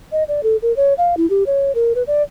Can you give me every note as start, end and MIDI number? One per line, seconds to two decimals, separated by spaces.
0.12 0.23 75
0.28 0.41 74
0.43 0.56 69
0.62 0.74 70
0.76 0.93 73
0.98 1.15 77
1.17 1.28 64
1.30 1.44 67
1.46 1.72 73
1.75 1.93 70
1.95 2.03 71
2.07 2.22 74